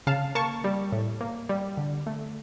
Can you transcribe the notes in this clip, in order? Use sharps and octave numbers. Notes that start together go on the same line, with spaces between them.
C#3 F5 A5
A#3 A5 C#6
G3
A2
A#3
G3
D3
A3